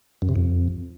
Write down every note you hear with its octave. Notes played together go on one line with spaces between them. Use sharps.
F#2
C3
F2